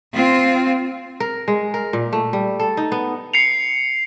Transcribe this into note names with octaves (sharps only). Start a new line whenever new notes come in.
C4 F4
A#4
G#3
A#4
A#2
A3
G3
A4
D#4
B3
C7 C#7 F7